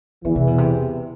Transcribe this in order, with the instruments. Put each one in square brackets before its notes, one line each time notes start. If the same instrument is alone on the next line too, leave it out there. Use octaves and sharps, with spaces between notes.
[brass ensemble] E2 E3 [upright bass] D3
[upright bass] C3
B2
C3